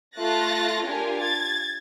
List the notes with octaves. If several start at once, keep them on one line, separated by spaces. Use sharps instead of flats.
A3 F4 F#6 A6 A#6
D4 F4 G4 A#4 G#5
G#6 A6